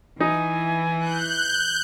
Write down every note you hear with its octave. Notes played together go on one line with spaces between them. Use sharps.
E3 D#4 G#5
F#6 G6